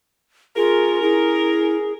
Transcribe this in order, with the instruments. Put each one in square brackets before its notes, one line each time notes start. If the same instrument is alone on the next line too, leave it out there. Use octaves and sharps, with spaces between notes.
[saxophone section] C#4 A#4 [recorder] F4 [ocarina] G#4
[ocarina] E4 [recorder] G#4